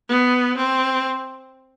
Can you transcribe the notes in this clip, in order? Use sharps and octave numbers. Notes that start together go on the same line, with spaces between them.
B3
C4